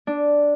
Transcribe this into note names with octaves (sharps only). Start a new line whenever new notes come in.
D4